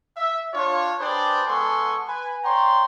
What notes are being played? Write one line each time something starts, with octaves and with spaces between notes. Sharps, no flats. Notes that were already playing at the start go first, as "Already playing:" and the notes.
E5
D4 F4 C#5
D4 G4 G#4 B4 C5 D5
G#3 B3 A4 G#5 C6 C#6
B4 G#5
C#5 D5 G5 A#5 C6